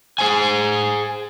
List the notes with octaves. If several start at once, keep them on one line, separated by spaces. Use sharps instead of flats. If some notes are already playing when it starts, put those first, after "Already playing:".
G#4 C5 G#5